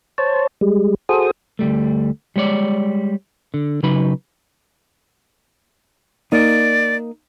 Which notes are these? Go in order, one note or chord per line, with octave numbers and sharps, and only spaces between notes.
C5 C#5 A5
G3 G#3
F#4 G#4 A4 C5 D#6
D2 G#2 G3 A3
G3 G#3 C#5 D5
D3
C#3 F#3 D#4 B4 B5
A#3 D#4 D5